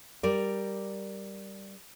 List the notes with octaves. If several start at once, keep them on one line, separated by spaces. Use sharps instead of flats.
G3 A#4 D5